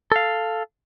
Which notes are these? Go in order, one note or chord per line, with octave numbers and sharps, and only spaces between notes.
A4 F5